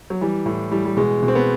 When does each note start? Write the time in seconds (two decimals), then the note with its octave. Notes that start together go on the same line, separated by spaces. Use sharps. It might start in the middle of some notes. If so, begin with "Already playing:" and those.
0.10 F#3
0.21 E3 G3
0.46 A2
0.71 E3 G3
0.85 G3
0.97 B2 G#3
1.23 B2
1.28 C4
1.35 B3